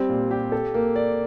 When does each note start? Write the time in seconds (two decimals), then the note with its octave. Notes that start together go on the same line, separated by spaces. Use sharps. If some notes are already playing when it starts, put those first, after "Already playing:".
Already playing: G3 C4 C5
0.09 A#2
0.31 G4
0.52 A4
0.74 A#3
0.96 D5